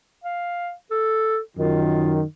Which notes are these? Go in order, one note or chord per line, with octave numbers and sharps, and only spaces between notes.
F5
A4
F#2 D#3 F4